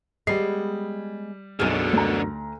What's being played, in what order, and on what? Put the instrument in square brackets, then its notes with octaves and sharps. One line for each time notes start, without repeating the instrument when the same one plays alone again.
[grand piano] G3 C7 [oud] G#3 B3
[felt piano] B1 G#4 F6 [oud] F#2 G#3 [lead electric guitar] B2 D3
[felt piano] D2 A#5